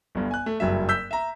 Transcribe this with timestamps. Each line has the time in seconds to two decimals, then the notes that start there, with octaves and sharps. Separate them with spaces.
0.15 G1 G2
0.31 G#5 F#6
0.46 A3
0.60 F#1 G2 F#3 E5
0.89 E6 G6 B6
1.11 E5 A#5